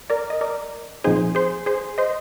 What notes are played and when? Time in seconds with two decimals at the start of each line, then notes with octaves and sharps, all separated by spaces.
0.10 A#4 D5
0.30 D#5
0.41 A#4 D5
1.04 A#2 F3 C4 D#4 G#4 C5
1.35 G#4 C5
1.66 G#4 C5
1.98 C5 D#5